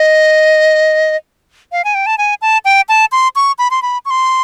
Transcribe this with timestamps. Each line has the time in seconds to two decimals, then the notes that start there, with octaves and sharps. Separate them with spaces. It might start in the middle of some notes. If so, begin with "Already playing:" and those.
Already playing: D#5
1.72 F5
1.85 G#5
1.95 G5
2.06 A5
2.18 G#5
2.42 A5
2.65 G5
2.89 A5
3.12 C6
3.36 C#6
3.59 B5
3.71 C6
3.82 B5
4.05 C#6
4.10 C6